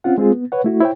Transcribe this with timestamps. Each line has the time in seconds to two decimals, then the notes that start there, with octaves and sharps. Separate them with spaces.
0.04 C4 C#4 F4 F#5
0.18 G#3 C4 F4 G#4
0.32 B3
0.52 B4 C#5 F#5
0.64 A3 E4 F#4
0.81 E4 C5 C#5 G5